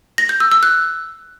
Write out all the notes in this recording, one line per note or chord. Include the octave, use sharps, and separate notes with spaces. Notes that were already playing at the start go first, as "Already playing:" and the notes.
A#6
G6
E6
E6
F#6